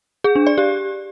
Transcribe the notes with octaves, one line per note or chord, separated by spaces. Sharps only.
G#4
D4
D5
G4